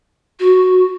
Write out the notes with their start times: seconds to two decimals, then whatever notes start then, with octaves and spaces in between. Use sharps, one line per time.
0.40 F#4